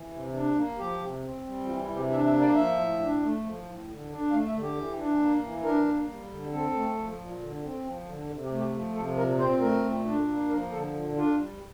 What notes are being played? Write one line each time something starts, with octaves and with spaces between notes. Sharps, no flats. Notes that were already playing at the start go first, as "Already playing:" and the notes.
Already playing: E3
C3
D4
A#3
F3 G4
C3
C4
G3
E3 F4
E4
C3
G4
D4 E5
E5
A#3
D5
F3 E5
A2
D4
A3
F3
A2
D3
D4
A3 F5
E5
D3
G4
E3
D4
A#3
E3
D4 A#4
A#3
G3
D3
C4 A4
A3
F3
A#2
D3
C4
F3
D3
C3
G4
A3
G4
F3
C3 A4
A#2 A#4
C4 C5
A3 A#4
A#2
D4
A#3
F3 A#4
D3 A4
A#2
D4 F4
G3